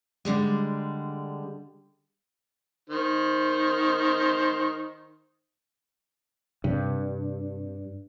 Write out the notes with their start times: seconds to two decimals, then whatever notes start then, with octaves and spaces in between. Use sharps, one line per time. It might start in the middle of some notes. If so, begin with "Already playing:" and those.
0.25 D3 G3 G#3
2.90 D#3 C5
6.64 G2 C3